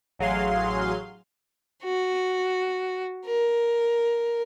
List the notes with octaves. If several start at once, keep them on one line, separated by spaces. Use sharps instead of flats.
A1 F#3 G#4 F5 C6
F#4
A#4